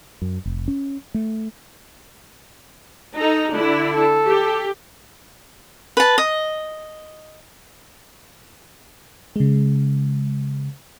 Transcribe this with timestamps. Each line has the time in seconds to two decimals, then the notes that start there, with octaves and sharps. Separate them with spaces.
0.22 F#2
0.46 F1
0.68 C#4
1.14 A3
3.15 D#4 A4 A#5
3.54 D3 D4 E4
3.94 A4
4.28 G4
5.97 B4 A5
6.18 D#5
9.36 C#3 G#3